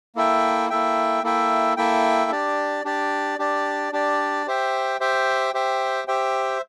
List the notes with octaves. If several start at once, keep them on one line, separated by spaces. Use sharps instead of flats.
A#3 E4 A4 E5 G5
A#3 E4 A4 E5 G5
A#3 E4 A4 E5 G5
A#3 E4 A4 E5 G5
D4 G4 D5
D4 G4 D5
D4 G4 D5
D4 G4 D5
G4 C5 E5 G5
G4 C5 E5 G5
G4 C5 E5 G5
G4 C5 E5 G5